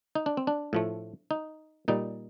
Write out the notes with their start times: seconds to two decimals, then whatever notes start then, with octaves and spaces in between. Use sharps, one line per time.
0.15 D#4
0.26 D4
0.37 C4
0.47 D4
0.73 A2 F3 A3
1.31 D#4
1.88 A#2 G3 D#4